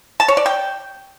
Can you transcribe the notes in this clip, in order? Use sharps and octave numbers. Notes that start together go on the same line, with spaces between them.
A5
C#5
D5
G5